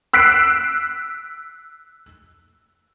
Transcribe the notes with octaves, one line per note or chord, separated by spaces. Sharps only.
E6 F#6 B6 C7 D7